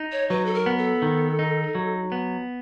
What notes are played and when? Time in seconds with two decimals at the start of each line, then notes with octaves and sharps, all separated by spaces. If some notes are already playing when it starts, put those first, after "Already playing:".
Already playing: D#4
0.12 C#5
0.30 F#3 B4
0.46 A4
0.54 A#4
0.66 B3
0.78 A4
1.02 D#3
1.39 D#4
1.75 F#3
2.12 B3